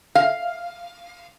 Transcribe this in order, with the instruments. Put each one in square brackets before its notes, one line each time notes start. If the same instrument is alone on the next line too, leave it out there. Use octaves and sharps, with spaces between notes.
[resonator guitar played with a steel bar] F5